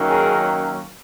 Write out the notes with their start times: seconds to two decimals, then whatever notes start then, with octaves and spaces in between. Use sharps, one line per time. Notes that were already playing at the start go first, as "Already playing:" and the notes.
Already playing: F#2 D#3 F#3 A#3 C#4
0.08 G#4 A#4